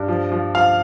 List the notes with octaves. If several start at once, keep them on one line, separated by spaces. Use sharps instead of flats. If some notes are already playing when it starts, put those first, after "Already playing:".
Already playing: G2
F3
F3
F3 F5